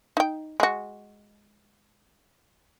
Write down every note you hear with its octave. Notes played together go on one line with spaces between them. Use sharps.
D#4 G5
G#3 F#4